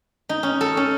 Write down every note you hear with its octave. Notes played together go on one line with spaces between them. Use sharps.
D#4
C#4
A4
C#4